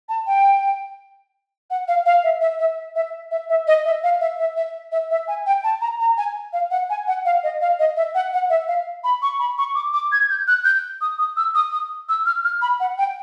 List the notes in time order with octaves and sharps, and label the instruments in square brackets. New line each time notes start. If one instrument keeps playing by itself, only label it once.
[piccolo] A5
G5
F#5
F5
F5
E5
E5
E5
E5
E5
E5
D#5
E5
F5
E5
E5
E5
E5
E5
G#5
G5
A5
A#5
A#5
G#5
F5
F#5
G#5
F#5
F5
D#5
F5
D#5
E5
F#5
F#5
E5
F5
B5
C#6
B5
C#6
D6
D6
G#6
G6
F#6
G6
D#6
D#6
E6
D#6
D#6
E6
F6
F6
B5
F#5
G5